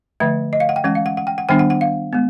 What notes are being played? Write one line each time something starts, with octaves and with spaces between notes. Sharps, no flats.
D3 F3 A3 E5
D#5
F5
F#5
G5
E3 G#3 C#4 F#5
F5
F#5
F#5
G5
F#5
D#3 G3 B3 D4 G5
F#5
F#5
F5
G#3 B3